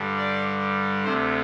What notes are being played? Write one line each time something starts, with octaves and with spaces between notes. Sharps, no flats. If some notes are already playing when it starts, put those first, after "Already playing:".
Already playing: G2 D3 G3
D5
D2 C3 A3 C5